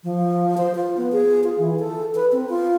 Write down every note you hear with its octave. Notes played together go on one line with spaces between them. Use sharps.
F3
C5
F4
B3
G#4
F4
E3
A4
B4
C4
F4